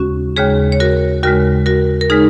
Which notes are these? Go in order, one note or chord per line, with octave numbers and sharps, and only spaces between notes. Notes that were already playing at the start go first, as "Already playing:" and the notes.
Already playing: D#2 C#3 G#3 C#4 F#4
D#2 C#3 G#3 G#4 C#5
C#5
F#4 A#4
D#2 C#3 G#3 F#4 A#4
F#4 A#4
A#4
C#3 G#3 D#4 G#4